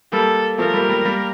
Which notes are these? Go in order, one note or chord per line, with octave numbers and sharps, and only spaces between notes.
G3 A#3 A4
F3 A3 A#4
G3 A#3
G3 A#3
G3 A#3